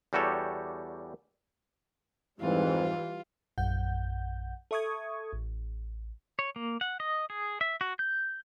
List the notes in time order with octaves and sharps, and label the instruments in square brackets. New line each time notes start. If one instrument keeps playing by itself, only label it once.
[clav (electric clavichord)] E2 G3 F#4 G4 A4 C#5
[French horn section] F2 G#2 C4 [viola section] E3 G3 [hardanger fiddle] F4
[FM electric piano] A#1 F#2 F#5 G6
A4 E5 C#6 D#6 G#6
A1
[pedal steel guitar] C#5
A#3
F#5
D#5
G#4
E5
F#4
G6